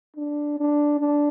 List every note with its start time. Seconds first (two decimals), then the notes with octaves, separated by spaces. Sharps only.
0.17 D4
0.59 D4
1.00 D4